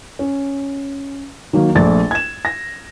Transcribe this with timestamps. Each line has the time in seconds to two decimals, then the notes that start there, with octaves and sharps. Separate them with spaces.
0.19 C#4
1.53 D#3 F#3 A#3
1.75 A#1 A3 D5 A6
2.11 G#6 E7
2.45 A#6